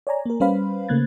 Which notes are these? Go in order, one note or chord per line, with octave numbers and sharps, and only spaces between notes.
C#5 D5 G#5 A#5
A#3 A#4
G3 C#4 B4 C5 F5 B5
C#3 A3 A#3 F#6 G#6 A6